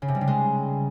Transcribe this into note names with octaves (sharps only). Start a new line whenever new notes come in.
C#3
C3
G3
C#3
G#3